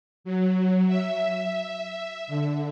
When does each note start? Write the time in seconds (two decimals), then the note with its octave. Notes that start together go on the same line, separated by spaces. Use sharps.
0.24 F#3
0.87 E5
2.27 D3